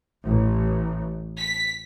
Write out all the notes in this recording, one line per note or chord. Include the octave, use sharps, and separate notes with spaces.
A1
B6